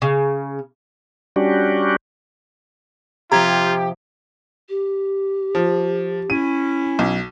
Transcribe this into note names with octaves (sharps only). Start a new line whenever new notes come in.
C#3
G3 C#4 D4 F#4 G4
C3 F3 F4 G4 A#5 G#6
G4
F3
C#4 E4 D#7
B1